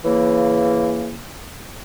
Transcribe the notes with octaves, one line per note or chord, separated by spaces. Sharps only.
C#3 E3 A#3